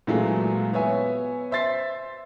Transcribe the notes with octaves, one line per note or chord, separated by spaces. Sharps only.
A#2 E3 F#3 G#3 A3
B3 C#5 E5 G#5
C5 E5 C6 A6 C7